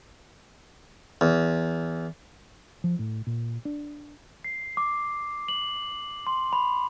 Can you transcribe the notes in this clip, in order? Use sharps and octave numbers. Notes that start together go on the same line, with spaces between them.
E2
F3
A2
A#2
D4
C7
D6
F#7
C6
B5